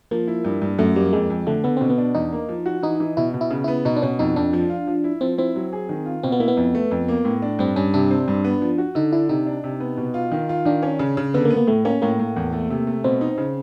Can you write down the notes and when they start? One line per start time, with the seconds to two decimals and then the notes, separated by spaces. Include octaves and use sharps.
0.11 F3 A#3
0.28 E4
0.45 G2
0.62 G2
0.79 F#2 A3
0.96 G3 A#3
1.13 F2 G#3
1.30 F2
1.47 D3 A3
1.64 D3 B3
1.77 B2 C4
1.90 B3
1.98 D4
2.15 E2 D#4
2.32 A#3
2.49 F3
2.66 F#4
2.83 E3 D#4
3.00 E3
3.17 B2 E4
3.34 B2
3.41 E4
3.50 C#3
3.64 B3 E4
3.85 B2 D#4
3.96 D4
4.02 B2 C#4
4.19 F2 D#4
4.36 F2 D4
4.53 F3
4.70 F4
4.87 F3
5.04 E4
5.21 F3 C4
5.38 C4 E4
5.56 F#3
5.73 G#4
5.89 D#3
6.06 F4
6.23 B2 C4
6.32 B3
6.40 A#3 E4
6.48 B3
6.57 F2
6.75 A3
6.91 F2
7.08 A#3
7.25 A2
7.42 D4
7.59 G2 C4
7.76 G2 C#4
7.94 C3 D4
8.11 C4
8.28 G2
8.45 B3
8.62 F3
8.78 F#4
8.95 D3 D#4
9.12 D4 E4
9.29 C3 D#4
9.46 D4
9.64 C3
9.80 B3
9.98 B2
10.14 F4
10.32 D#3
10.49 F4
10.65 D#3 D4
10.83 C#4
10.99 C#3
11.17 C#3
11.34 D3 B3
11.45 A#3
11.50 B3
11.57 A#3
11.67 A2 A3
11.85 A#3 C#4
12.02 A2 A#3
12.20 A2
12.36 E2
12.53 A3
12.70 C3
12.87 A3
13.04 B2 C4
13.21 D#4
13.38 C#3